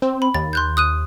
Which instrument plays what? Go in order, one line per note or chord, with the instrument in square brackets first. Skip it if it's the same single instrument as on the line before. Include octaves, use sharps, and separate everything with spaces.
[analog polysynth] C4
[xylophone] B5
[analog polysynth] D#2 [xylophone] A6
[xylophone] C6 F#6 G6
D#6 F#6 D#7